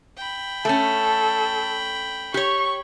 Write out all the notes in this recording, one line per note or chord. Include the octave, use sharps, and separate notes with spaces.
G5 B5
A3 C#4 A4
G4 C#5 C#6